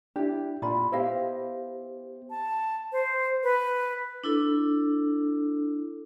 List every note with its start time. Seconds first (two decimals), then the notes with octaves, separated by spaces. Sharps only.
0.16 D4 E4 G4
0.62 A#2 F4 D5 B5
0.92 B3 E4 G4 C5 D#5 F5
2.30 A5
2.92 C5
3.43 B4
4.24 D4 E4 A4